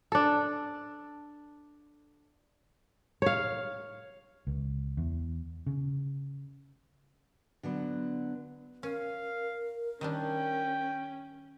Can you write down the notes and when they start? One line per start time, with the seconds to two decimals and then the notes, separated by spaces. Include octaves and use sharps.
0.12 D4 A4
3.22 C#5 F5
4.47 C#2
4.97 E2
5.67 C#3
7.63 D3 F#3 B3
8.83 C#4 A#4 F5
10.01 D#3 G3 C#4 D4 G5